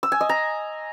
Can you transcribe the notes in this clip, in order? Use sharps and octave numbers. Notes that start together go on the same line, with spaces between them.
E6
G#5
D#5
A#5